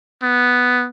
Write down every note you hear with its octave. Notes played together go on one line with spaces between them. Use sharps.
B3